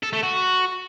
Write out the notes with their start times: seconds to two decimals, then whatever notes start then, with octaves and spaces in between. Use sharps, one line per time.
0.03 A4
0.13 A3
0.23 F#4